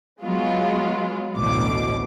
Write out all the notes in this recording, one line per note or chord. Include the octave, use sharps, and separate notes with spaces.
F#3 G#3 B3 F4
A1 D2 B2 D6